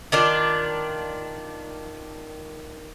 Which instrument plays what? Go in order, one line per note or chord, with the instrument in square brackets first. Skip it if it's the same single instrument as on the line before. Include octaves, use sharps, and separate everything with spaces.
[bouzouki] D#3 D4 F4